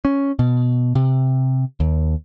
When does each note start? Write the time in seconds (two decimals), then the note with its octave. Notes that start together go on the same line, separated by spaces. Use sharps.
0.05 C#4
0.39 B2
0.95 C3
1.80 D#2